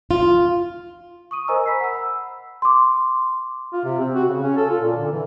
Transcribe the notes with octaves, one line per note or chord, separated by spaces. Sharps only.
F4
C#6 D#6 D#7
A#4 C5 D#5 G#5 A#5 E6
B5 B6 C7
F#5 E6
B5 E6
C6 D6
F4
C3
C4
F#4
C#3
C#4
A4
F4
A#2
D3
E3